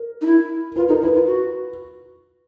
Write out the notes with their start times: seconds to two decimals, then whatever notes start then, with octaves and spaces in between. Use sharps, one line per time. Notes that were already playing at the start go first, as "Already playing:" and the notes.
Already playing: A#4
0.22 D#4
0.26 E4
0.76 F4 B4
0.89 D#4 A#4
1.01 E4 B4
1.14 F4
1.26 F#4